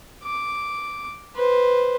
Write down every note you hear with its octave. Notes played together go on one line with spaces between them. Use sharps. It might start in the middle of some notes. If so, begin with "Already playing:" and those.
D6
B4 C5